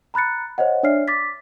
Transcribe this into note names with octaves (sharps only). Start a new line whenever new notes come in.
A#5 B5 F#6 A6 C#7
C5 C#5 D#5 F#5
D4 C#5 D5 E5 F6 C7
D6 A6 B6